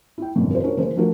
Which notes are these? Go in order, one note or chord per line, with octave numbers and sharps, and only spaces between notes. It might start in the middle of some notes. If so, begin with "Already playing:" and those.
E4 G5
G#1 F#2 B2 D3 E3
A#4 C5
C#4 D4 E4 F#4 A#4 C#5
C#3 E3 A#3 A#4 C5
F3 A3 D4 F#4 A#4